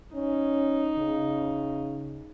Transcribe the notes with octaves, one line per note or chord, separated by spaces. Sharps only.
C#4 D#4
C#3